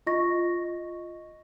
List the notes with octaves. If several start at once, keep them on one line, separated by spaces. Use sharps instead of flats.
F4 D#5 C#6 A#6